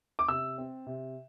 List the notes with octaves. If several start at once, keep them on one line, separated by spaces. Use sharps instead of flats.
D6
C3 E6
C4
C3